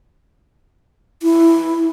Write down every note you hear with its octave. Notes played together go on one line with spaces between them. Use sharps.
E4